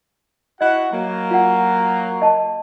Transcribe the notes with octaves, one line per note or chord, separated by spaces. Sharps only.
E4 F#4 D#5 F#5
F#3 A#3
F4 F#5
D#5 A5